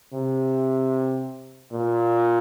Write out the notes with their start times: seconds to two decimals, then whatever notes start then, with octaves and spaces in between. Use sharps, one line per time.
0.13 C3
1.73 A#2